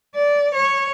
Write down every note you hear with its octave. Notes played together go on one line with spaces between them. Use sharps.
D5
C#5